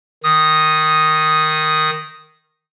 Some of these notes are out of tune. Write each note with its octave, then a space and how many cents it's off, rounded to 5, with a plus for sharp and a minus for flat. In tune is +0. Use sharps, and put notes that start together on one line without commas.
D#3 -5 D#6 +0